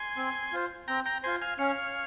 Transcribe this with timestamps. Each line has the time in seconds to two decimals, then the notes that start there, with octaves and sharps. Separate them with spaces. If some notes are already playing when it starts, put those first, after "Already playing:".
Already playing: G#5 C6
0.17 C4
0.53 F4 C5
0.88 C4 G5 A#5
1.06 G5 A#5
1.23 F4 C5 G#5 C6
1.41 F5 G#5
1.58 C#4 C#5 F5